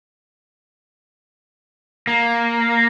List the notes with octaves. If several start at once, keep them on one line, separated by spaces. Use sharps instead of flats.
A#3